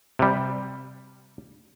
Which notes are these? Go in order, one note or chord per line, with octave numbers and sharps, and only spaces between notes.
C3 G3